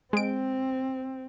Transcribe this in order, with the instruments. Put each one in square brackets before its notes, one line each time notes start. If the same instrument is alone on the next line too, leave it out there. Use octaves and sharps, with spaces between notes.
[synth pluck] G#3 D7 [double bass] C4